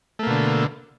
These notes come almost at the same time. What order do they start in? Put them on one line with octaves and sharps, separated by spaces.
A3 A#3 B2 D3